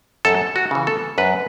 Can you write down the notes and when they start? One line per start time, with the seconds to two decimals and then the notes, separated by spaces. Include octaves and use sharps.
0.25 F#2 A4
0.56 F#4
0.71 C#3 E3
0.87 A4
1.18 F#2 B4